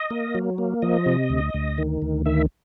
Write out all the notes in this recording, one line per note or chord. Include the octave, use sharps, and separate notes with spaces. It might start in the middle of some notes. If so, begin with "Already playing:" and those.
Already playing: D#5
A#3
F#3
A#3
F3 D#5
C3
D2
D2
D#3
D2
D#3 E5